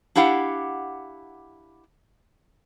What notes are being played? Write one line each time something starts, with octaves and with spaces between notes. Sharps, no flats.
D4 E4 G4 F5 F#5